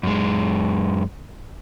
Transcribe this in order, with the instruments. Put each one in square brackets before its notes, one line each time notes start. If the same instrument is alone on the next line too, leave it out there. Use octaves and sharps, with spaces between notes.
[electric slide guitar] F#2 G#3